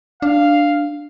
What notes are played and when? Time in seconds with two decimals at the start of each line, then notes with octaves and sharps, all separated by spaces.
0.22 D4 F5